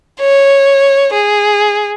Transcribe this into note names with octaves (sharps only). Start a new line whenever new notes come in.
C#5
G#4